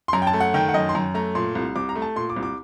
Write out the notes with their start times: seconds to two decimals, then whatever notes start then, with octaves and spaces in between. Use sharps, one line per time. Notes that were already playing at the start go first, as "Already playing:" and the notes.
0.08 C6
0.13 F#2 A#5
0.22 G5
0.27 A5
0.33 A3
0.40 F#5
0.54 D#3 G5
0.69 F#5
0.74 F#2 D#5
0.89 C6
0.95 F#2 A#5
1.14 A3 A#5
1.35 A#2 C6
1.55 C2
1.76 C2 D6
1.89 A#5
1.96 A3
2.02 A5
2.16 A#2 C6
2.30 D6
2.36 C2
2.43 D6